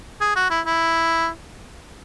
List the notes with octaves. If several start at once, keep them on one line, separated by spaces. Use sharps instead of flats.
G#4
F#4
E4
E4